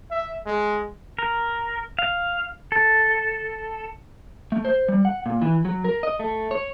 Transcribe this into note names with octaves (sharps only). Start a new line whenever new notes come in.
E5
G#3
A#4
F5
A4
A3
C5
G3
F#5
A#2
E3
F#3
A#4
D#5
A3
C#5